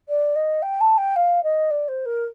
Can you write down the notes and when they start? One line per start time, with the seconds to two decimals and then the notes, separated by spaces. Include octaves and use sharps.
0.09 D5
0.36 D#5
0.62 G5
0.81 A5
0.98 G5
1.16 F5
1.43 D#5
1.71 D5
1.88 C5
2.06 A#4